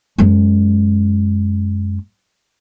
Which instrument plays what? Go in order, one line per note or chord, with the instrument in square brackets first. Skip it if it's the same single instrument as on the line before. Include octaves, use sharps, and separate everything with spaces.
[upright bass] F#2 G#3